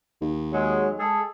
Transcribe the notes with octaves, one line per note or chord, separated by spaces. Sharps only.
D#2
F#3 G#3
G#3 G#4 A4